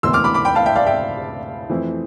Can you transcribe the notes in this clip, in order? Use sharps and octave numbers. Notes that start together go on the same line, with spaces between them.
E1 D2 C3 E3 B3 C6 E6
D6 F6
B5 D6
B5 D6
G5 B5
F5 A5
E5 G5
D5 F5
E5 G5
F2 E3 A3 C4 E4